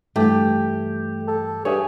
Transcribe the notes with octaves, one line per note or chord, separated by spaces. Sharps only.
G2 E3 A3 G4
A4
G2 G#4 C#5 E5